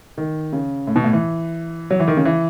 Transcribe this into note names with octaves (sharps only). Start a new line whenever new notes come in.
D#3
C#3
A2
B2
A2
E3
F#3
E3
D#3
C#3
E3